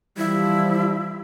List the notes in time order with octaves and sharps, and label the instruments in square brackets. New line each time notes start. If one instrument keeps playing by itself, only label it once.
[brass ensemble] E3 F3 G3 [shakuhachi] E4